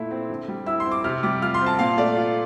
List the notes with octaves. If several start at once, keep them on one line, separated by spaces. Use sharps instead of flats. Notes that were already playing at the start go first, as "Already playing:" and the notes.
Already playing: A#2 A3 E4
C4
D3
G3
E4 E6
C6
C4
D6
C3 F6
G3 D6
F4 F6
C6
C4
A5
A#2 F5
A3 D5
F4